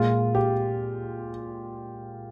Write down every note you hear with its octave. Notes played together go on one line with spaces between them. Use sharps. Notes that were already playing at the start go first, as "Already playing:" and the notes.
Already playing: A#2 G#3 F4
G4